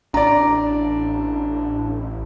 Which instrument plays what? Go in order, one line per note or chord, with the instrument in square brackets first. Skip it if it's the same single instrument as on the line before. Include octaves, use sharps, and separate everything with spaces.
[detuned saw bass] A1 [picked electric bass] D4 [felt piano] D5 A#5